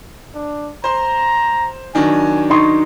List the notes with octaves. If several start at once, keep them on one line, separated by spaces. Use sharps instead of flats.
D4
C5 A#5 C6
D#3 F#3 D4 G#5
D#4 C6 C#6